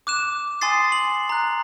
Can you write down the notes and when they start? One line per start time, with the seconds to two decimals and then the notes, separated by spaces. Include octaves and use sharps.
0.07 D6 F#6 E7
0.61 G#5 C6 D#6 A6 C7
0.92 F#7
1.29 A#5 F#6